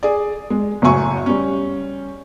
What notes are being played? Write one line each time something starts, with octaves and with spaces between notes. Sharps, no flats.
G#4 D5
G#3
F#1 A2 F#3 E5 G#5 C#6
G3 C#4